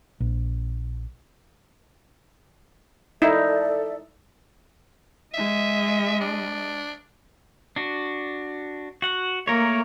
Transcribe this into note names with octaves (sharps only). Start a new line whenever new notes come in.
A#1
D#4 E4 A4 D5 E5
G#3 D#5 E5
D4
D4 F#4
F#4 F#5
A3 A#3 A#4 C#5